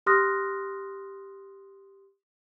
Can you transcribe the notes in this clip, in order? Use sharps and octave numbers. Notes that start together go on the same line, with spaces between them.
G4 C6 D#6 F6 F#6 A#6